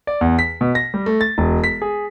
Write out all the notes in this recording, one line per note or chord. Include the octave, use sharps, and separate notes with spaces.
D5
E2
B6
B2
A#6
G3
A3
A6
E1
B6
G#4